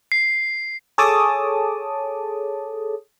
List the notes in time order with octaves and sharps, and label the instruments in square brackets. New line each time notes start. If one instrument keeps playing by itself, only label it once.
[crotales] C7
[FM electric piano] G#4 A4 C#5 A5 D6 D#6